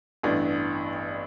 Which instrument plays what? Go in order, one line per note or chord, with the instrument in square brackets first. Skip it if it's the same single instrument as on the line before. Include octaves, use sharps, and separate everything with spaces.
[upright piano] A1 G2 E3 B3 D4